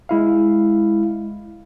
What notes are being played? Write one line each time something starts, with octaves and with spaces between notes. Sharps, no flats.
G#3 E4 F5